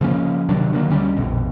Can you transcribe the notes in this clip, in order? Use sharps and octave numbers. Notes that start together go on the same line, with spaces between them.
C#3 F3 A#3 C#4
C3 D#3 F#3 D4
D3 D#3 F#3 A#3
D2 D3 G3 C#4
A#1 F2 B2